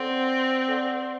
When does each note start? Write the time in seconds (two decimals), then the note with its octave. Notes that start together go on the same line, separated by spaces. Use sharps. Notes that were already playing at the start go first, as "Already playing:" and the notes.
Already playing: C4 A4 D5 F#5 C6
0.68 A4 D5 F#5 C6